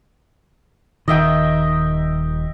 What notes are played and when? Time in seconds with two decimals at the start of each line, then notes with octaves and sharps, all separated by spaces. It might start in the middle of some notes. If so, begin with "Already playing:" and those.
1.08 D#1 D#3 D#5 E5 G5